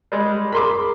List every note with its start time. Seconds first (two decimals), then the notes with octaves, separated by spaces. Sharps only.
0.12 G3 G#3
0.52 G#4 A#4 B5 C6 D6